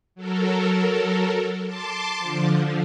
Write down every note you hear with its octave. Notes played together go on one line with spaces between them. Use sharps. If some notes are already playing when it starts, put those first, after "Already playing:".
F#3 A4 A#4
A5 C6 D6
D3 F3